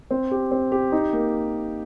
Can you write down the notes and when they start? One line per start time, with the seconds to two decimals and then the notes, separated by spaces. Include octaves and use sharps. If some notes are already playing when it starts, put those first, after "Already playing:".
0.11 C4
0.31 G4
0.52 C4
0.72 G4
0.92 D#4
1.13 A#3